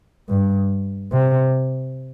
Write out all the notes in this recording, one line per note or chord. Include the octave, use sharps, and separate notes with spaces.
G2
C3